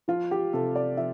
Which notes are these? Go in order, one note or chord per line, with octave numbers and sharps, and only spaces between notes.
F3 F4
G4
C3 A4
D5
F3 E5